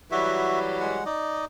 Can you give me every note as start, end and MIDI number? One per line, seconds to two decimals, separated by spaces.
0.11 1.04 52
0.11 1.04 54
0.11 1.04 55
0.11 0.59 66
0.11 0.59 76
0.80 1.04 56
0.80 1.04 78
1.06 1.45 63
1.06 1.45 74
1.06 1.45 75